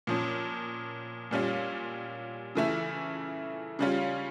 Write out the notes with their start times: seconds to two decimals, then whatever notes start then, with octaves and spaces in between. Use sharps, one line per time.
0.07 A#2 F3 C#4
1.31 A#2 G3 C#4 F4
2.55 C#3 E3 A3 E4
3.79 C#3 G3 C#4 F4